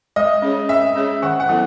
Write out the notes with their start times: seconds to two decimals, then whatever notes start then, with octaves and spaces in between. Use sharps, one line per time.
0.16 G#3 D#5
0.42 C#4 G#4 C#5
0.69 G#3 E5
0.96 C#4 G#4 C#5
1.22 D#3 F#5
1.40 F#5
1.49 F#3 B3 E4 A4